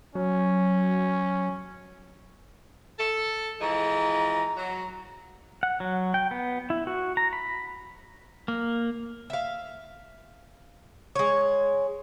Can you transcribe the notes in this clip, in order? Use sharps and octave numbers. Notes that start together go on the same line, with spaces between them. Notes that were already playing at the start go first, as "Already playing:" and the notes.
F#3 C#4
A4
E3 F3 G#3 A#5
F#3
F#5
F#3
G5
B3
E4
F#4
A#5
B5
A#3
E5 F5
G#3 C#5